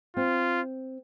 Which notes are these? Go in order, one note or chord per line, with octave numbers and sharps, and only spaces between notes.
C4 F4